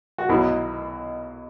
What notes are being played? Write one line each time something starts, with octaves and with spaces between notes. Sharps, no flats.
F#4
B1 B2 F#3 E4